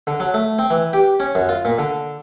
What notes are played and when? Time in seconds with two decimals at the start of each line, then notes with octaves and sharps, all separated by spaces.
0.07 D3
0.20 F#3
0.34 A3
0.59 C4
0.70 E3
0.93 G4
1.20 C#4
1.35 F#2
1.49 F4
1.65 A#2
1.78 D3